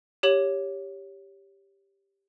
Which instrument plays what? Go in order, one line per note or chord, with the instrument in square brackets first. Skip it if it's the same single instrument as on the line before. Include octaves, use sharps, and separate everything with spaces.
[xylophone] G4 C#5 F#7